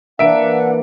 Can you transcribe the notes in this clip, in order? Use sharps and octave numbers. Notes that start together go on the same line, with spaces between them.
E3 A#3 D4 E5 F#5 D7